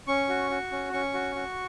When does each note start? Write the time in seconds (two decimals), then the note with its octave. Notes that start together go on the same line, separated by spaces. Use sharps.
0.07 C#4 C#6
0.29 F#4
0.51 F#4
0.72 C#4
0.93 C#4 C#6
1.14 F#4
1.35 F#4